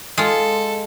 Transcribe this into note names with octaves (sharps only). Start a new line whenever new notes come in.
G#3 F4 A4